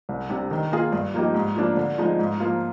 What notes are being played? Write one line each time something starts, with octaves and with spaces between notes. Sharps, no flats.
C2
C3 G3 D4
D#3
A#3 F4 G#4
G2
F3 A#3 D#4 G4
G#2
F3 A#3 D4
D3
F3 G#3 D#4
G#2
F3 A#3 F4